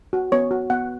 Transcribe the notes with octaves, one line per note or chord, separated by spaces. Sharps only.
F#4
B3 C#5
F#4
B3 F#5